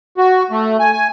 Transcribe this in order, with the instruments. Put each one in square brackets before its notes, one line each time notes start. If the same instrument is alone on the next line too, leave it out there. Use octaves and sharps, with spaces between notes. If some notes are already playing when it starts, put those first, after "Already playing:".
[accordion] F#4
A3
G#5
G#5